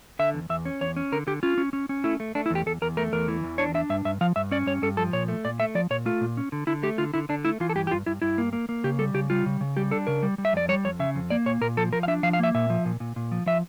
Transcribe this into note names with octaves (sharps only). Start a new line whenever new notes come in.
D3 E5
E2
E2 E5
C#4
E2 C#5
C#4
D3 A#4
D3 G4
C#4 F4
C#4
C#4
C#4
A3 E4
A3
A3 D4
E4
E2 G4
E2 A4
E2 A#4
A3 A#4
E2 A#4
E3
E2
D4 C#5
D4 E5
G2 E5
G2 E5
F3 F5
G2 E5
C#4 D5
G2 C#5
G2 A4
F3 A4
A#2 C#5
A3
A#2 D5
A3 E5
F3 D5
A#2 C#5
A3 F4
A#2
C#4
D3
D3 E4
A3 G4
D3 F4
D3 E4
D3 D4
A3 E4
E3 F4
A4
G2 G4
G4
G2 F4
G2 E4
G2 E4
A#3
A#3
A#3
C#3 G4
G3 A4
C#3 G4
G3 F4
C#3
C#3
G3 G4
D4 A4
C#3 A#4
G3
G3
E5
F2 D5
G3 C#5
F2 C#5
C#3 E5
F2
A#3 D5
A#2 C#5
A#2 A#4
F3 A4
F3 A#4
F5
D4 E5
F3 F5
F5
A#3 E5
A#2 E5
F3
A#2
A#2
A#2
F3
F3 E5